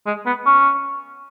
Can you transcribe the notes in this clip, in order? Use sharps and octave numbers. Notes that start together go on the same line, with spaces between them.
G#3
B3
C#4